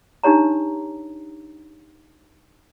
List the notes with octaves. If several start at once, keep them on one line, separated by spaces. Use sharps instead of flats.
D4 D#4 G4 C#5 A#5